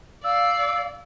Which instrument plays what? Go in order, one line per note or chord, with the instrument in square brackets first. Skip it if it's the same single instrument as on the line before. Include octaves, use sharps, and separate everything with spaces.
[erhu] D5 [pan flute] F5 [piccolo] E6